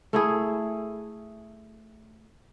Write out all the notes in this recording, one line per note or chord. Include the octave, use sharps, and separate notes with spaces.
A3 E4 G#4